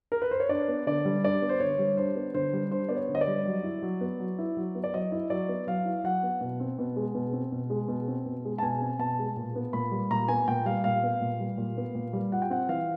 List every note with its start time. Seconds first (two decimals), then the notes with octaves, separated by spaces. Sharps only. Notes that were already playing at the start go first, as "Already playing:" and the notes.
0.12 A#4
0.22 B4
0.31 C5
0.40 C#5
0.49 D4 D5
0.68 B3
0.87 D3 D5
1.05 G3
1.24 D4 D5
1.42 B3
1.49 C5
1.60 D3 C#5
1.79 G3
1.97 D4 C5
2.16 B3
2.34 D3 C5
2.53 G3
2.71 D4 C5
2.89 B3 D5
2.96 C#5
3.09 D3
3.15 D#5
3.21 D5
3.27 G3
3.45 F#3
3.64 E4
3.82 F#3
4.01 B3
4.20 F#3
4.39 E4
4.57 F#3
4.75 B3
4.84 D5
4.93 F#3 D#5
5.12 E4
5.30 F#3 D5
5.49 B3
5.67 F#3 F5
5.85 E4
6.04 F#3 F#5
6.23 B3
6.41 B2
6.60 C4
6.79 B2
6.96 G#3
7.15 B2
7.33 C4
7.52 B2
7.70 G#3
7.88 B2
8.08 C4
8.26 B2
8.45 G#3
8.58 A5
8.63 B2 G#5
8.82 C4
8.99 B2 A5
9.19 G#3
9.37 A#2
9.56 B3
9.73 A#2 B5
9.91 G3
10.11 A#2 A#5
10.28 B3 G#5
10.48 A#2 G5
10.65 G3 F5
10.84 A#2 F5
11.03 B3
11.21 A#2
11.40 G3
11.58 A#2
11.77 B3
11.95 A#2
12.13 G3
12.32 F4 F#5
12.42 G5
12.50 C4 F#5
12.69 E3 F5